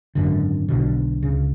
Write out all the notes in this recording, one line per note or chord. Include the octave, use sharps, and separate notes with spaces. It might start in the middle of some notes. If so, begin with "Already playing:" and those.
G#1 F#2 D3
B1 B2 D3
C#2 C#3